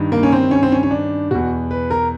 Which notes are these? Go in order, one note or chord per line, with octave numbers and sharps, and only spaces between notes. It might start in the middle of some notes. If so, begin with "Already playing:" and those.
Already playing: G2 D#3
A#3
C#4
C4
C#4
C4
C#4
C#4
D4
E2 B2 F#4
B4
A#4